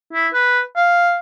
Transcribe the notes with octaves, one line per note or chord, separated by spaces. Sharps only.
E4
B4
F5